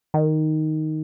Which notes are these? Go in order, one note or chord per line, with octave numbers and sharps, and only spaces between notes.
D#3